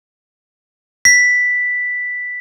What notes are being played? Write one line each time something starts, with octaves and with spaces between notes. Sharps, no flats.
B6